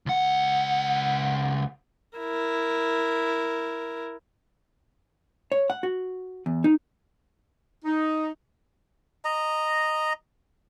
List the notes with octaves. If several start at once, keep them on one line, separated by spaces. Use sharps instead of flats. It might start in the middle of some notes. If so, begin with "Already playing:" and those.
C#2 F#5
E4 A#4
C#5
F#5
F#4
E2
D#4
D#4
D#5 A#5